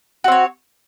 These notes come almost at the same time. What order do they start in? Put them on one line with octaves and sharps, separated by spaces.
F#4 C4 C#5